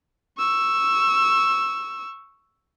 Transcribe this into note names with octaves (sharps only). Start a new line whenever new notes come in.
C#6 E6